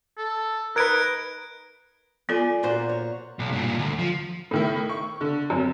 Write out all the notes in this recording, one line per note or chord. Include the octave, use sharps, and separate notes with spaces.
A4
D#4 A#4 B4 F#6 G#6 D7
B3 F4 A4 D5 G#5 C6
A#2 F#4 C5
C#5
B1
G2 A#2
D2
F3
A2 D#3 E4
C#6
D3
F#2 C4